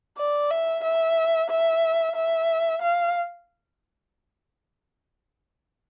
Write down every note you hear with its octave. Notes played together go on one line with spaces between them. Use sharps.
D5
E5
E5
E5
E5
F5